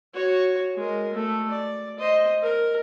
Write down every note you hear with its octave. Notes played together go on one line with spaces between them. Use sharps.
F#4 C#5
G#3 A#4
A3
D5
C5 D#5
A#4